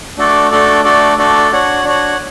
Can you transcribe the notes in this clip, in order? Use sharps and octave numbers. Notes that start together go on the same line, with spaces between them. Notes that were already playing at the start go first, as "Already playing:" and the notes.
A3 D4 F#4 A4 D5
A3 D4 F#4 A4 D5
A3 D4 F#4 A4 D5
A3 D4 F#4 A4 D5
D4 F#4 C#5 F#5
D4 F#4 C#5 F#5